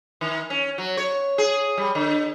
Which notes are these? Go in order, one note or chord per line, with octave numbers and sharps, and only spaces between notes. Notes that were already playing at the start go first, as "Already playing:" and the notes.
D#3
C#4
F#3
C#5
G#4
G3
D3